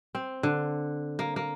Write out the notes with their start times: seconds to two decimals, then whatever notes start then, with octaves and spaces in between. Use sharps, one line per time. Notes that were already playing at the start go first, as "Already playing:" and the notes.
0.15 C4
0.43 D3
1.19 A#3
1.36 A#3